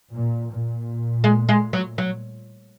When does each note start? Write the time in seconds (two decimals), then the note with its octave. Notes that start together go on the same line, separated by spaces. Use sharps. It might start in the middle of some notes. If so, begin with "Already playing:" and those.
0.13 A#2
0.50 A#2
1.24 G#3
1.49 G#3
1.73 F#3
1.98 F#3